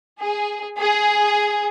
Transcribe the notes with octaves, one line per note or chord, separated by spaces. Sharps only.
G#4
G#4